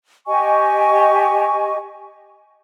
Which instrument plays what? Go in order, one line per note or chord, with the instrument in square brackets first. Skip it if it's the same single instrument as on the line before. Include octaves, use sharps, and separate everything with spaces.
[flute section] G4 D#5 G#5 C#6